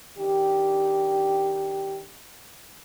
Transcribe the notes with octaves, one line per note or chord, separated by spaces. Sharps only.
D#3 D4 G4